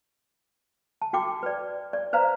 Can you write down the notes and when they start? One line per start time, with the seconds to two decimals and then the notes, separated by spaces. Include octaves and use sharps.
1.02 A5
1.13 F#4 G5 D6
1.43 B4 D5
1.93 D5
2.13 B4 C5 F5 A#5